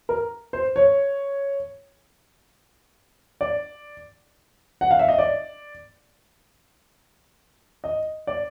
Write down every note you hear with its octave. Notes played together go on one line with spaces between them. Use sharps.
A#4
C5
C#5
D5
F#5
F5
E5
D#5
D5
D#5
D5